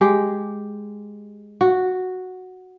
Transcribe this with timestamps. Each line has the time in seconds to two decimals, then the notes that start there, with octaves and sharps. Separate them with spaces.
0.01 G#3 G4
1.61 F#4